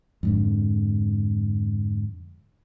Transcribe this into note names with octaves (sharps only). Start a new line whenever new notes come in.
F2 G#2 D3